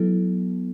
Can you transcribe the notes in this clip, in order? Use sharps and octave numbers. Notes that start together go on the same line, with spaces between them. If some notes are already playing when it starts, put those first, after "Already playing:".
Already playing: F#3 B3 E4 A4